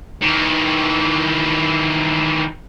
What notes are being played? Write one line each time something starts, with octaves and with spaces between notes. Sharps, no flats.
D#3 E3